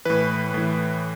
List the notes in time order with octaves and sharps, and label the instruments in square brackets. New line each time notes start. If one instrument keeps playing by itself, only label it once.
[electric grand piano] A2 E3 B4
A2 E3